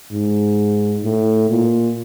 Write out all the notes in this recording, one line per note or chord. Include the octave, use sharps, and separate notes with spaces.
G#2
A2
A#2